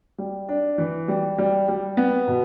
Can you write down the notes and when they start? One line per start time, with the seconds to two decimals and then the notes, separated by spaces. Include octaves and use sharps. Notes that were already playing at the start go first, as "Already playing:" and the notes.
0.18 G3
0.49 D4
0.78 E3
1.08 G3
1.38 G3
1.68 G3
1.97 B3
2.27 B2